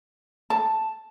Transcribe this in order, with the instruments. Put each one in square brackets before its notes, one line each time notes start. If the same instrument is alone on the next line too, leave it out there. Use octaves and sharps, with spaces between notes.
[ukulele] A5